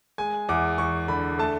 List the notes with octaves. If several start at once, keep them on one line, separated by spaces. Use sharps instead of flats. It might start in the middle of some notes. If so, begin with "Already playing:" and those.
G#3 G#5
E2 D6
E2 C#6
D3 B5
A3 A5